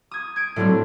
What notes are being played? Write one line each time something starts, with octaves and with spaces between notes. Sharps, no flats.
D#6 G#6
G#6 D7
A2 F#3 G3 A3 C4 D4